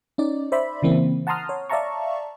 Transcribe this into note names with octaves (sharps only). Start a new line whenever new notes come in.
C#4 D#4 D5
C5 D5 E5 B5
C#3 E3 A#3 C4
F#5 A5 A#5 C6 D#6 F6
C#5
D5 E5 F5 A5 A#5 C#6